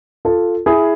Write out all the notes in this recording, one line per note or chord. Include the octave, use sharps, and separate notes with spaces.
F4 A4
E4 G#4